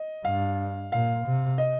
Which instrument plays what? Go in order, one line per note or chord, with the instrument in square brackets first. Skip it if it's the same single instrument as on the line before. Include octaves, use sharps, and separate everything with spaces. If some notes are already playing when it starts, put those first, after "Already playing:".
Already playing: [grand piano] D#5
[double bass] G2 [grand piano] F5
[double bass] A#2 [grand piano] F5
[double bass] C3
[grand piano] D#5